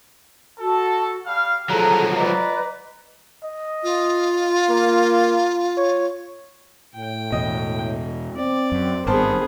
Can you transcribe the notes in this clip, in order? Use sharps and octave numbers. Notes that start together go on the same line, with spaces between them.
F#4 A4 A5
G3 F5 F6
F3 F#3 G#4 A4 A#5
B4 D5 D#5 A#5
D#5
F4
A#3
C#5
A2 G5
E2 B2 D#5
C4 D5
F#2
G#1 G2 B3 G#4 A#4 C5 A5